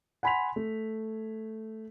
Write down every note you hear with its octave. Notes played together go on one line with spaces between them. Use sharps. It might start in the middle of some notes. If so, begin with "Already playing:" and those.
F#5 G#5 B5 C6 B6 F7
A3